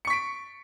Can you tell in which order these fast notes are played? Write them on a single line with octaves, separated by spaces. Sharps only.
C#7 C#6 B6 D7